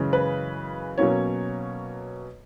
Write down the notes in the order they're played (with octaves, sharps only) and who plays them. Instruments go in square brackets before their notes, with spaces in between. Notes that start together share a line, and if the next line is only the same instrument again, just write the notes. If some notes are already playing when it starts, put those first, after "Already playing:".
Already playing: [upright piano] F#2 C#3 E3 G#3 C#4
B4
B2 F#3 A#3 C#4 C#5